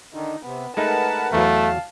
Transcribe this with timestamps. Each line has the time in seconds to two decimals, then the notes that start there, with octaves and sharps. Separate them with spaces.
0.14 D3 D#3 D#4
0.45 C3 B3
0.77 G#3 A3 D#4 A#4 B4 F#5 A5
1.33 E2 F#3 A3 F5 A5